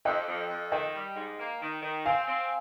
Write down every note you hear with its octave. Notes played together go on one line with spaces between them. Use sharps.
F2 D#5 G5
F2
F2
D#3 D#5 G5
G3
G#2
A#3
D#3
D#3
C4 F5 G#5
C4